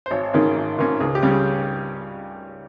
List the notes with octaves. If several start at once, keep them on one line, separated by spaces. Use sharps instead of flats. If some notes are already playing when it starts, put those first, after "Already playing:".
C5
G#1 C#5
G#2 D#3 A#3 C#4 G#4
G#1
G#2 D#3 A#3 C#4
C#2 G#4
G4
C#3 G3 C#4
G#4